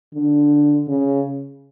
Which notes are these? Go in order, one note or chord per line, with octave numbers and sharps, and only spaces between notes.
D3
C#3